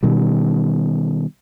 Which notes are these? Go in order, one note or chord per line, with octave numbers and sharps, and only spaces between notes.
B2 D#3 G3